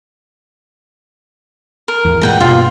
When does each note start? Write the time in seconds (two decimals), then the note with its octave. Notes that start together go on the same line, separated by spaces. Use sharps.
1.88 A#4
2.05 A1 E2
2.21 G2 A#2 G#3 F#5 G5 A#5
2.41 G2 B2 B3 F4